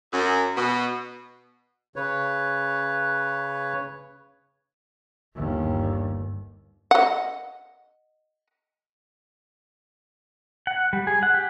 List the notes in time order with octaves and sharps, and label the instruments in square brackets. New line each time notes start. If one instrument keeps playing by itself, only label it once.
[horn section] F#2
B2
[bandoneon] C#3 B4 C#5
[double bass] G1 D#2
[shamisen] D#5 F#5
[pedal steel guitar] F#5
G3
G#4
F#5
G4